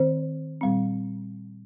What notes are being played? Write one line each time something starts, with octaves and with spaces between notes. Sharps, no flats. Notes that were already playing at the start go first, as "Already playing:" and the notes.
Already playing: D#3 C4 C5
A#2 G3 C4